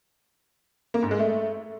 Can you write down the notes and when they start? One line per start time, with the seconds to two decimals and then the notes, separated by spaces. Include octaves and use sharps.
0.94 A#3
1.03 G#2
1.11 G#3
1.19 A3